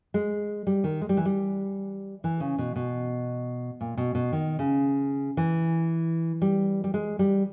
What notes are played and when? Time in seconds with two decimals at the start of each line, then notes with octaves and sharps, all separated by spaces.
0.14 G#3
0.67 G3
0.84 D#3
1.01 G#3
1.09 G3
1.17 E3
1.25 G3
2.24 E3
2.40 C#3
2.58 B2
2.76 B2
3.81 A#2
3.97 B2
4.15 B2
4.32 D#3
4.59 C#3
5.37 E3
6.42 G3
6.84 G3
6.94 G#3
7.19 G3